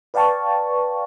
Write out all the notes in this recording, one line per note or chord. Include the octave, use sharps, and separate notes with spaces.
B4 D5 F5 G5 A5 C#6